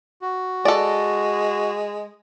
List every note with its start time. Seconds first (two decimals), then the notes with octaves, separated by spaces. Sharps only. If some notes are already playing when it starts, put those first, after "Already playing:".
0.21 F#4
0.65 G#3 A4 D5